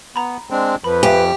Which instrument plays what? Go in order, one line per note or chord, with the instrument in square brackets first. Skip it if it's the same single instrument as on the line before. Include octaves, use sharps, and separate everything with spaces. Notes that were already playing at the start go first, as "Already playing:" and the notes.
[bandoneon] B3 [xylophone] A#5 B5
[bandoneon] G#3 C4 D4
[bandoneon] F2 F3 [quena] B4 [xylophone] B5
[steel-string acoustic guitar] G4 [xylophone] E5 F5 G#5